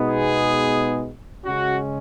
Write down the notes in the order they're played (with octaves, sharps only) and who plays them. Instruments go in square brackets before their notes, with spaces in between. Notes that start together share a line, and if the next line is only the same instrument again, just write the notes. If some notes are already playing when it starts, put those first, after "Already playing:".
Already playing: [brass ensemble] B2 G#3 B3 D#4
G#4
C#3 G#3 C#4 F#4